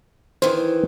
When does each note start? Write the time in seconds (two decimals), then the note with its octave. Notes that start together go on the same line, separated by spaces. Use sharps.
0.42 D#3 E3 C5